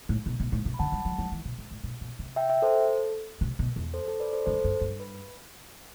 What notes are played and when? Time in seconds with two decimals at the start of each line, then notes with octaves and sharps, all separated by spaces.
0.09 A2
0.26 B2
0.40 B2
0.52 A2
0.65 C3
0.74 B5
0.79 D3 F#5 A5
0.92 G3
1.05 F#3
1.18 F#3
1.32 E3
1.45 B2
1.58 A2
1.71 A2
1.84 B2
2.01 B2
2.19 C3
2.36 E5 G5
2.50 E5 G5
2.62 A4 C5
2.75 A4
3.41 C3
3.59 B2
3.76 E2
3.94 A4 C5
4.08 A4 C5
4.20 B4 D5
4.33 A4 C5
4.46 G2 A4 C5
4.64 G2
4.81 G2
5.00 B4